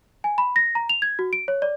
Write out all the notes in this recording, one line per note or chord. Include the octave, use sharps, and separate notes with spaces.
G#5
B5
A#6
A#5
F7
G#6
F#4
D7
C#5
D5